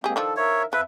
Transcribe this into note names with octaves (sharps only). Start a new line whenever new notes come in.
G#3 A#3 C4 G4 G#4
D#3 F3 D4 A4
A#4 C#5 E5
F2 F3 B4 E5